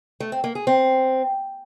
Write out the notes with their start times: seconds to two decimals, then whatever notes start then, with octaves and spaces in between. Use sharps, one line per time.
0.20 A3
0.32 C4
0.44 A#3
0.55 G#4
0.67 C4